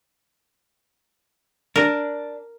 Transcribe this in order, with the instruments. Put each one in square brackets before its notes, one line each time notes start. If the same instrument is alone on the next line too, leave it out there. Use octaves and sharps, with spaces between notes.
[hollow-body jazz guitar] D4 [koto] A#4